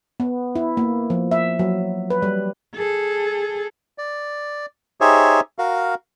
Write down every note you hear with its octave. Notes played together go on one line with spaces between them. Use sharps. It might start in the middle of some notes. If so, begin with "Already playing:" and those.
B3
E4
A#3
F3
E5
F#3
B4
G3
G#4 A4
D5
D#4 G4 G#4 C5 C#5 E5
F#4 A#4 F5